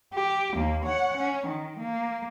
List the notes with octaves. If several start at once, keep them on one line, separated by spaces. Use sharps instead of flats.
G4
D#2 A#3
C#5 F#5
C#4
D#3
A#3